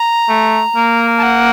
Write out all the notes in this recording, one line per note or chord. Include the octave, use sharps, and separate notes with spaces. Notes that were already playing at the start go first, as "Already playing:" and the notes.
Already playing: A#5
A3
A#3
A5
F#5